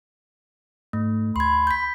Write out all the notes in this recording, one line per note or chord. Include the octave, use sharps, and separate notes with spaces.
G#2 A3
D2 B5 C6 G#6
G6 B6